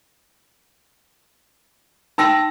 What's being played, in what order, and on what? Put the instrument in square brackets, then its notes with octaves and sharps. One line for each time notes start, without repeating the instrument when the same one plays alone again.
[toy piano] D#4 G5 C6 [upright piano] A5 E6 A#6